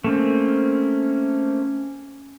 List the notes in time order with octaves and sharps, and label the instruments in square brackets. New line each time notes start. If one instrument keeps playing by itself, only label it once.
[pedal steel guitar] A3 A#3 C4 [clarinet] C#4